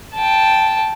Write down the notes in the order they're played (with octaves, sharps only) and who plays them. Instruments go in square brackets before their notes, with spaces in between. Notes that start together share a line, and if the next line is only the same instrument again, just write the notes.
[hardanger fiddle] G5 A5